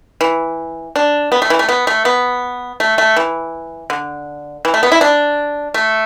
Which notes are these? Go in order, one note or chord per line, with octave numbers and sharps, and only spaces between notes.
E3
D4
B3
A3
E3
A3
B3
A3
B3
A3
A3
E3
D3
E3
A3
B3
E4
D4
A3